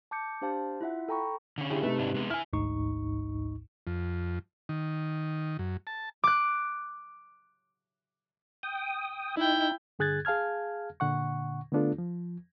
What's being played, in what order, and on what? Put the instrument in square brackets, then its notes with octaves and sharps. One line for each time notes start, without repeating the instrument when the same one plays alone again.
[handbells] A5 D6 G6 C#7
D4 G4 C5 F5 A5
E4 F4 E5 F#5
A4 G5 A#5 B5 C#6
[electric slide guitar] D3 C#4
[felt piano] E4 G4 G#4
[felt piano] C3 D#4 B4 [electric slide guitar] A3
[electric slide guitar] G#2 D4 E4
G#3 B3
[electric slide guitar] E4 G#5 [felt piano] F6
[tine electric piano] A1 D2 G#2 D#4 C#6
[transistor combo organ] F2
D#3
F#2
A5
[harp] D6 F#6
[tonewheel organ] G5 D#6
[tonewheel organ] D#4 [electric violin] E4 G5
[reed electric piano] G2 D3 G#4 F#6 G#6 A6
G#4 F5 A5 F6 G#6
A#2 D3 F#5 C#6
D3 A3 B3 D4 F4 A4
F3